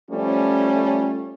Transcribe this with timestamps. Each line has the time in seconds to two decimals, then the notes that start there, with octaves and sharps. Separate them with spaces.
0.10 F3 G3 A3 C#4